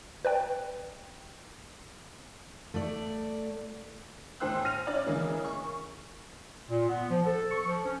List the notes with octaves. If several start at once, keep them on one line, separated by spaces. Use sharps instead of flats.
B4 D5 G5
A3 D5
E2 A2 C5 G5 E6 F#6
F6 A#6 D#7 F7
C#4 E4 C#5 D5
C#3 E3 G#3 A#3
C#6
A#2
B3
F3
A4
C#6
F3
C#4